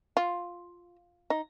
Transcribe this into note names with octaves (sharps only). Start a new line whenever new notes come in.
F4
D#4